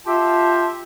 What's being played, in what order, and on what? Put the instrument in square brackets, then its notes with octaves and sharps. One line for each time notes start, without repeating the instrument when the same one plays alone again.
[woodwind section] F4 G4 E5 G5 A5